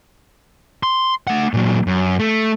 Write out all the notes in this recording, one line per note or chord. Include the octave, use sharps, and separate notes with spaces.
C6
A3 F#5
A#2 F#3
F#2
A3